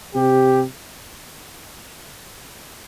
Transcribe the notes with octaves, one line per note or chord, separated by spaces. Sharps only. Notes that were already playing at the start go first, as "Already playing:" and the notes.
C3 G4